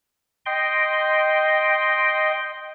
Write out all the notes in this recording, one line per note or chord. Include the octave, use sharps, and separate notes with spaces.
D#5 G5 C6